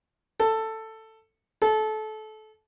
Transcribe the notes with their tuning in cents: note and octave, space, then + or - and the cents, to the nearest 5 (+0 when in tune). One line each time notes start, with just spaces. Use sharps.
A4 +10
A4 -25